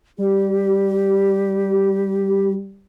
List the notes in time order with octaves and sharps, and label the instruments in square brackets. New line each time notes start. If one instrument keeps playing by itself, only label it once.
[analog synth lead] G3 [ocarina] G4